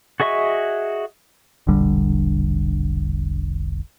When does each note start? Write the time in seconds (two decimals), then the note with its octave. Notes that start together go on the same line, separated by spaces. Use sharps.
0.20 F#4 G#4 D#5 E5 C#6
1.67 E1 A#1 D3 G3